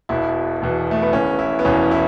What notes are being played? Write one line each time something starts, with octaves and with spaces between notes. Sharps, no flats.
E1 E2 B2 E4
E1 E2 B2
A3
B3
E1 E2 E3 C#4
E4
B3
E1 E2 E3 C#4
E4